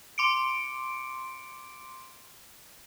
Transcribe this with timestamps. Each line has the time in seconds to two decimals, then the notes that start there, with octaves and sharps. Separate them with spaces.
0.18 C6 D6 C#7 D7